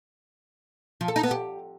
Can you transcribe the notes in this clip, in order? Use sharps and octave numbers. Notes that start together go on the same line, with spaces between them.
F3
A4
D#4
B3
G4